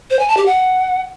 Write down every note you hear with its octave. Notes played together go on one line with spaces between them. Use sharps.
C5
G#5
A5
G4
F#5